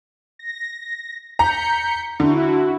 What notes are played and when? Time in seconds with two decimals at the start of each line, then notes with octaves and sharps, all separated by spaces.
0.39 A#6
1.39 A#5 G6 B6 C#7
2.20 D3 E4 F#4